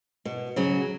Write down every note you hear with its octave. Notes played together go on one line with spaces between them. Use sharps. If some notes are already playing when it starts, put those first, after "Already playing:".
B2
C#3 F#3